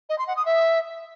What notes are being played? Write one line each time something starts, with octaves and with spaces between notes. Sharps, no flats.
D#5
C6
F#5
D#6
E5